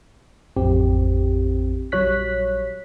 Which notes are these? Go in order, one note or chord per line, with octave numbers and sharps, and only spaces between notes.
A1 F2 C4 G4
A#1 F#3 G3 C#5 F#6 B6